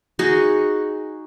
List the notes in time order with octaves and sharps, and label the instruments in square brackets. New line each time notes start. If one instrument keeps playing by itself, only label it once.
[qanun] D#4 F#4 G#4